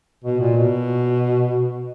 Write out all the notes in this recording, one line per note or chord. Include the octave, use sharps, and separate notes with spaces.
B2
A#2
B2